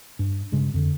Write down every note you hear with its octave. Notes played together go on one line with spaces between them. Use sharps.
G2
G2 C#3 G#3
F2 D3